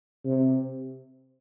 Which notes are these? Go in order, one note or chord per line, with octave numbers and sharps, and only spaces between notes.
C3